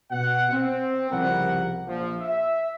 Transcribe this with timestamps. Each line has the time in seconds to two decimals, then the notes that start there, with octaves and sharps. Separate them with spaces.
0.11 B2 F#5
0.52 C4
1.11 C2 C#3 F3 G3 A#4 F#5
1.88 A#1 F3
2.20 E5